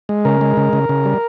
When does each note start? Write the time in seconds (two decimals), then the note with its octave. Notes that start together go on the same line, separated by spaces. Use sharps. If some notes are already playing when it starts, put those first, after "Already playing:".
0.09 G#3
0.25 C#3 A#4
0.41 G#3
0.57 C#3
0.73 C#3
0.89 C#3
1.05 G3